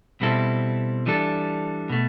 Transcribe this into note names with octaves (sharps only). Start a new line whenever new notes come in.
B2 G3 C4 E4 A4
E3 G3 D4 A4
B2 A3